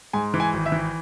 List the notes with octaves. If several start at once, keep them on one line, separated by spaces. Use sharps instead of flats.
G#2 G#5
E3
G#5
G#1
E5
E3